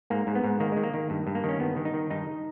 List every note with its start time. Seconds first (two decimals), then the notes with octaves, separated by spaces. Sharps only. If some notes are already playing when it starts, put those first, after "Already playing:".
0.10 G#2 A#3
0.27 G#2
0.35 B3
0.44 G#2
0.60 D#3 A#3
0.72 D#3 G#3
0.83 A#3
0.94 D#3
1.10 G2
1.27 G2
1.35 A#3
1.44 D#3 C#4
1.60 G2 B3
1.77 D#3
1.85 D#4
1.94 D#3
2.10 G2 D#4